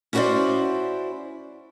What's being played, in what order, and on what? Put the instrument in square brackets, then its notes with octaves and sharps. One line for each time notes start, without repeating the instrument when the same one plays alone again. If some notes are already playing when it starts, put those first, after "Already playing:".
[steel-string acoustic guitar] C#4 E4 F#4 B4 C5 D5